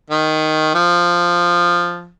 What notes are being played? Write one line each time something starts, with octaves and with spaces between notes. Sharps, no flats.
D#3
F3